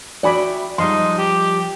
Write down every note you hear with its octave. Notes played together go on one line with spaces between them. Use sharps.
F#4 D5 E5 G5 G#5 B5
F3 G3 G#3 D#4 C6
G4